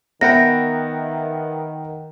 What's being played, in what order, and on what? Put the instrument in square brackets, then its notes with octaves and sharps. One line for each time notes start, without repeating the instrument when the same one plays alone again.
[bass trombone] D#3 [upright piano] B3 E5 B5 [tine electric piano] A#4 F#5 G5 [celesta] A#6